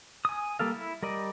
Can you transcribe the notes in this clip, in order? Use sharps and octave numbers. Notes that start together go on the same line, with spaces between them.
G#5 D#6
G3 A#3 A4 F5
E4
G3 A#4 D5 D#5